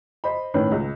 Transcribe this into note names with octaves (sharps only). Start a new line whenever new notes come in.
C5 D#5 B5
A2 D#3 C#4 B4 C#5
C#2